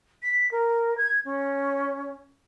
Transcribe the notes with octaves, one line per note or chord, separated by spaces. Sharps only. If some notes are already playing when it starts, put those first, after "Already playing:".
B6
A#4
G#6
C#4